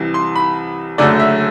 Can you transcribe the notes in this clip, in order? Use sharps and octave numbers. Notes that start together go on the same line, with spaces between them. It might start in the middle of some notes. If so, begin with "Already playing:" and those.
Already playing: C2 C3 E3
C6
B5
F#1 F#2 D3 A3 D5
E5